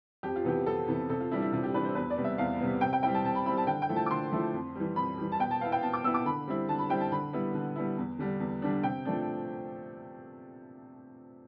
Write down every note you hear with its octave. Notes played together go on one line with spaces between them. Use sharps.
F2 G4
F4
C3 E3 B3 G4
F2 A4
C3 E3 B3
C3 A4
F4
E3 G3 D4 E4
E4
C3 F4
G4
E3 G3 D4 B4
C5
E2 B4
D5
C3 G3 B3
E5
E2 F5
C3 G3 B3
C3 G5
G5
G3 C4 E4 G5
A5
C3 A5
B5
G3 C4 E4 B5
A5
D3 G5
G5
F3 A3 E4
A5
D6
D3 C6
F3 A3 E4
F2
E3 G3
F2 B5
E3 G3
A5
B2 G5
A5
B3 E4 F5
G5
B2 A5
D6
B3 E4 E6
D6
D3 B5
G3 C4 E4
D3 A5
B5
G3 C4 E4 G5
A5
D3 B5
G3 B3 E4
D3
G3 B3 E4
E2
D3 G3 D4
E2
D3 G3 D4
C3 G5
F3 A3 D4